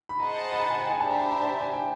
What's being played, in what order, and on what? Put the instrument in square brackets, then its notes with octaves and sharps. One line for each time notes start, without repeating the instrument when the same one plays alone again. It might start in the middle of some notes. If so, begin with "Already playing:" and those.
[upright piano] B5
[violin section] G#4 C5 D#5 F#5 A5 [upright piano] A#5
[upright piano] B5
A#5
G#5
G5
G#5
[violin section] D4 G4 C5 E5 [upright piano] A5
[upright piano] A#5
B5
A#5
A5
G#5
G5